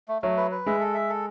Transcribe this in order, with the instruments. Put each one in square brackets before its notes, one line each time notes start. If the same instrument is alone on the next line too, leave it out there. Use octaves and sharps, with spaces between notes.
[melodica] A3
[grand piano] F#3 [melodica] A3
[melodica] B4
B4
[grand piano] G#3 [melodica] E5
[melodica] A4
E5
A4